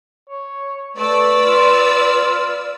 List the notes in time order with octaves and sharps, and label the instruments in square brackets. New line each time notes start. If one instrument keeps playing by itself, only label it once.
[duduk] C#5
[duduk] A3 [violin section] B4 D5 E6
[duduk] F4